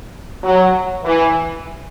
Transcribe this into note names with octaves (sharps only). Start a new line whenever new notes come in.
F#3
E3